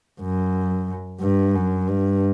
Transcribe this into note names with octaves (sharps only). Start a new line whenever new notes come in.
F#2
G2
F#2
G2